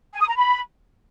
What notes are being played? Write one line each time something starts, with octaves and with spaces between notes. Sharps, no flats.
G#5
D#6
A#5
B5